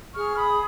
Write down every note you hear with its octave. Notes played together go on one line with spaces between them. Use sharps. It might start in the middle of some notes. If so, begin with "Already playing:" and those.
G#4 C#6 F6
B5 D#6